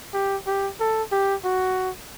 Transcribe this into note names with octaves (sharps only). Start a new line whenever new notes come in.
G4
G4
A4
G4
F#4